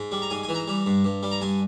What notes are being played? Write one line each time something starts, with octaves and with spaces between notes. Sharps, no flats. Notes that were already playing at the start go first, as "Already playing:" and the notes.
Already playing: G#2
G3
A#5
G#2 G#5
G#5
E3
A#5
G3
G2
G2
G3
A#5
G2 G#5